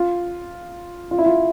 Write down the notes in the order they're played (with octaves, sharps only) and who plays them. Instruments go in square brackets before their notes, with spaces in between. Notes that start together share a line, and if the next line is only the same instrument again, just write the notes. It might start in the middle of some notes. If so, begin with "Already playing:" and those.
Already playing: [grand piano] F4
F4
E4
F4